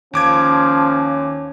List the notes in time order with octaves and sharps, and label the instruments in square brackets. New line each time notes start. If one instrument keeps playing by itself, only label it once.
[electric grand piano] D#2 D6 G#6 [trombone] F3 [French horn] C#4